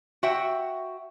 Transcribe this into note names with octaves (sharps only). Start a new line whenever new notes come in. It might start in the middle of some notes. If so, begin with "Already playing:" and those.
F#4 E5 G5